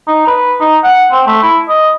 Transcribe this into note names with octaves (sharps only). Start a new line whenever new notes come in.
D#4
B4
D#4
F#5
C4
A3
E4
D#5